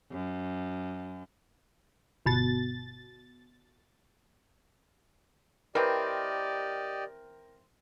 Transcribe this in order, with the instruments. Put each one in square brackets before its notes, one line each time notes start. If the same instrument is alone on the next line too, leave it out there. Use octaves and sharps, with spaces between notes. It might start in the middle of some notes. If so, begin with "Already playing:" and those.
[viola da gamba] F#2
[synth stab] G1 B2 A6
[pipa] E3 C4 [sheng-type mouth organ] G4 D5 D#5 [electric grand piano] A#4 G5